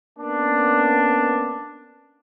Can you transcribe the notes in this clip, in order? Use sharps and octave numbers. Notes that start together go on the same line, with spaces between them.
A#3 B3 C#4 D4